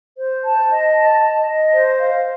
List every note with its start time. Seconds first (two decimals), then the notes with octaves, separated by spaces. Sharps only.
0.17 C5
0.44 A5
0.70 D#5
0.95 A5
1.21 D#5
1.47 D#5
1.72 C5
1.99 F5